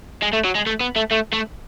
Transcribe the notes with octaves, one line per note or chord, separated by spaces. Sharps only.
G#3
A3
F#3
G#3
A3
B3
A3
A3
A3